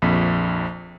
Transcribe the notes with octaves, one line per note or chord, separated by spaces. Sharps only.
A#1 F2